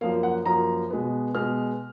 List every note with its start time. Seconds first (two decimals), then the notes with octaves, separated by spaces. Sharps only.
0.01 F#2 F3 A#3 F5
0.23 F#5
0.46 F#2 F3 A#3 A#5
0.90 B2 G#3 B3
1.34 B2 G#3 B3 F6